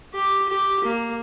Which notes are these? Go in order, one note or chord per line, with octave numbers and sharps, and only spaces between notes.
G4
G4
A#3